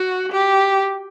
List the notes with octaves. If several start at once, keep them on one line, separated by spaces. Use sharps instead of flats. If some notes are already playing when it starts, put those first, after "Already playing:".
Already playing: F#4
G4